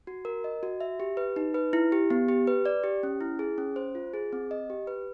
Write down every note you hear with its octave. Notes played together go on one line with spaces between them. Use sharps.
F#4
A#4
D#5
F#4
E5
G4
B4
D#4
B4
E4
G4
B3
G4
B4
D5
G4
C#4
E4
G#4
C#4
C5
F4
G#4
C4
D#5
G4
B4